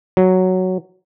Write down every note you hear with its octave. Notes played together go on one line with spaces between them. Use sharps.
F#3